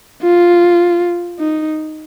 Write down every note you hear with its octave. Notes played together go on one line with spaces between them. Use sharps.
F4
D#4